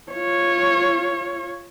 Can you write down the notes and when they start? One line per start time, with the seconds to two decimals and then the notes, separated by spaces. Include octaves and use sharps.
0.12 F4 C#5